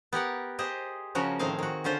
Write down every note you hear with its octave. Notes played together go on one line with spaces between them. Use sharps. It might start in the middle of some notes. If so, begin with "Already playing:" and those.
B3 G4 A#4 F#5
G4 G#4 C5 D#5
C#3 F3 C#4 F#4 A#4
A2 D#3 F3 C4 G#4 F5
D#3 F#4
D3 C#4 F4 C5